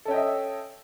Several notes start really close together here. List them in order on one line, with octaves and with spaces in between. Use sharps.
A4 C#4 G5 D#5 E5